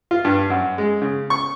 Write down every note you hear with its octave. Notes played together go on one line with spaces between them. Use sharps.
F4
G2
F#2
G#3
C#3
C#6